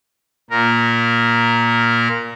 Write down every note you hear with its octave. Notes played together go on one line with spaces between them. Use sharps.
A#2 A#4